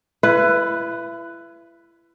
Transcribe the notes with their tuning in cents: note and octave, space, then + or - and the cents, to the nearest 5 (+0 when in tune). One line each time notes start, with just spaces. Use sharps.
E4 +35 B4 +5